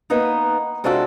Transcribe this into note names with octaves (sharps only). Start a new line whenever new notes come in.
A#3 B3 D#4 B4
C3 G#3 D4 F4 F#4 A4